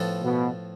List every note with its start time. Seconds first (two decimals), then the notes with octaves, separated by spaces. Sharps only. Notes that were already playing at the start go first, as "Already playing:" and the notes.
Already playing: A2 F3 B3 F4 A4
0.23 B2